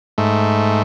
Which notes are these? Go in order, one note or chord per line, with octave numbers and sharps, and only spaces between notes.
G#2 A3